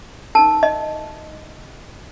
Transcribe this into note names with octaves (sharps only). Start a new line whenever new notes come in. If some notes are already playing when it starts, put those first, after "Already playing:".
D#4 A#4 A5
D#5